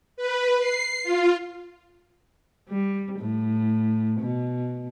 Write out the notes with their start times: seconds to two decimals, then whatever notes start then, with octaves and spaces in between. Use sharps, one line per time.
0.17 B4
0.59 C7
1.04 F4
2.69 G3
3.19 A2
4.21 B2